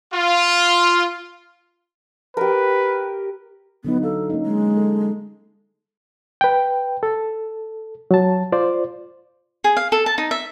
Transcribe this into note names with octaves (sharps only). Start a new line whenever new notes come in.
F4
G4 A#4 B4
D3 F#3 B3 D#4
A4 F5
A#3 C#4 D#4
G#3
A4
B4 G5
A4
F#3 A5
F4 C5 D5
G#4
F5
A4
A5
D#4
E5